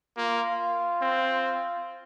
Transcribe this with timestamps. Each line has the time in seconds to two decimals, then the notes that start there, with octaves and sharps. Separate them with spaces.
0.17 A#3 F4
1.01 C4